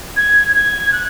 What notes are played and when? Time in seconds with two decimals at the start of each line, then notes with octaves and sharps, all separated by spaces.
0.16 G#6
0.55 G#6
0.92 F#6